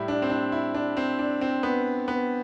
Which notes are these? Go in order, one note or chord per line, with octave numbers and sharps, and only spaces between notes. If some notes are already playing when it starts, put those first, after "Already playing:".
Already playing: A2 G3 E4
D4
C4
D4
E4
D4
C4
D4
C4
B3
B3